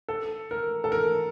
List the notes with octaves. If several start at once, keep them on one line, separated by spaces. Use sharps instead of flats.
A4
A#4
A4
A#4